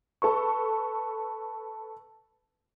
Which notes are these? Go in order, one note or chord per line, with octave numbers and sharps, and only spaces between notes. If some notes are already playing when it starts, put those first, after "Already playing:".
A4 B4 C#6